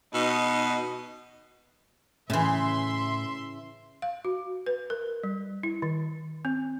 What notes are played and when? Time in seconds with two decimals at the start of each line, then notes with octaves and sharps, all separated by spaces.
0.14 B2 D#4
2.30 A2 C#3 E3 E5 C6
4.02 F5
4.25 F#4
4.66 B4
4.90 A#4
5.23 G3
5.63 E4
5.82 D#3
6.45 C4